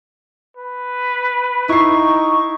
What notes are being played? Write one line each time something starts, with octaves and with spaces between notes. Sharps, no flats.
B4
D#4 E4 C#6 C7